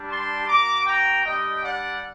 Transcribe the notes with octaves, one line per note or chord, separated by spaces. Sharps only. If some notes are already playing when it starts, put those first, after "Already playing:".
Already playing: G3 D4 G4
A5 C6
A#3 F#4 A#5 D6
G5 A#5
G3 D4 G4 D#5 G5
D5 F#5